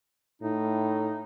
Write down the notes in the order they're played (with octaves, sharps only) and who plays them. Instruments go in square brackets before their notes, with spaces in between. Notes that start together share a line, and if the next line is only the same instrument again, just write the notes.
[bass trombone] A2 [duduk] D#4